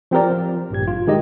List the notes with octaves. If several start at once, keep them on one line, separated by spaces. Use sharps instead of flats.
F3 C4 G4 A#4 D5
F3
G#1 G2 A#2 G4 G#6
F4
D#3 G#3 G4 D#5